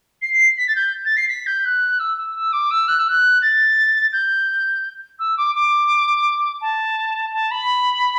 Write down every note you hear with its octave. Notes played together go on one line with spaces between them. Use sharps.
C7
C7
B6
A6
G6
A6
C7
B6
G6
F#6
E6
E6
E6
D6
E6
F#6
E6
F#6
A6
G6
E6
D6
D6
A5
A5
B5